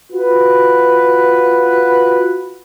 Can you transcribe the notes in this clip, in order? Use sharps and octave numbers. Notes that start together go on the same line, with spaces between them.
F4 F#4 B4